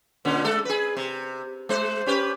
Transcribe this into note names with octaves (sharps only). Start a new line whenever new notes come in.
A#2 D3 C#4
G#3 A4
G#4 B4
C3
G#3 C5
C#4 G4 B4